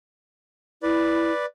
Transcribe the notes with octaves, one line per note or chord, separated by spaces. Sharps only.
E4 B4 D5